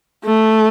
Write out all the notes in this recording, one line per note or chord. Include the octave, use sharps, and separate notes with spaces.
A3